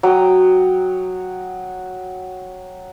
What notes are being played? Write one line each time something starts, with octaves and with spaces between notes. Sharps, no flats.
F#3 G5 D#6